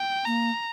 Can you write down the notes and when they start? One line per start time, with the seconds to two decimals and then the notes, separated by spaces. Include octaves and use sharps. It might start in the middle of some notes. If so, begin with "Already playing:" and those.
Already playing: G5
0.25 A#3 A#5